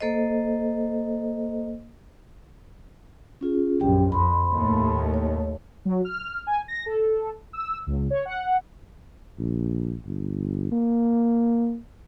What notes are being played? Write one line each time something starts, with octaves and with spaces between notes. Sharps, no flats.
A#3 A4 C5 D#5
C#4 F4 G#4
A#1 F#2 C#4 G4 G5
F2 B5 C6
D#2 A2 A3
C#5
F#3
F6
G#5
A#6
A4
E6
C#2
C#5
F#5
A#1
G1
A#3